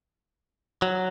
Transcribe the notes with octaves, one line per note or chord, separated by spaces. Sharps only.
F#3